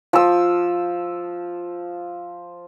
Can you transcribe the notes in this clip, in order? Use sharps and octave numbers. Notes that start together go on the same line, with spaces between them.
F3 E6